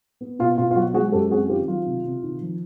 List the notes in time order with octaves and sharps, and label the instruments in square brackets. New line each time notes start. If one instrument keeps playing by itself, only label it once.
[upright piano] B3
B2 F4
B2 F4
F4
F#3 F#4
G#3 F#4 G#4
F#2 G4 A4
C4 F#4 G#4
D#3 F4 G4
F#3 F4
C3
C3
D#3
F3